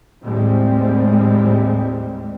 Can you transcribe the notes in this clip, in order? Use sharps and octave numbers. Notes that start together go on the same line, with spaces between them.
D#2 A2 C3 G3 G#3 C4